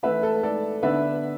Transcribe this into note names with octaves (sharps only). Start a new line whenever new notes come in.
E3 A3 E4 B4 E5
A4
A4 D5
D3 B3 D4 B4 E5